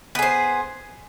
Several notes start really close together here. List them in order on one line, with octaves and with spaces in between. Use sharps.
B3 G#4 C5